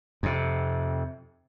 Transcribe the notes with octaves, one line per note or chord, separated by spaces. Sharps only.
F2 C3